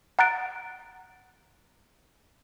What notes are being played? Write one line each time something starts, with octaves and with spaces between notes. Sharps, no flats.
F#5 A#5 F#6 A6 D7